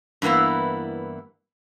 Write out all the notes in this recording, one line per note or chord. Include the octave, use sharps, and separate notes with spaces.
G2 E3 A#3 B3 E4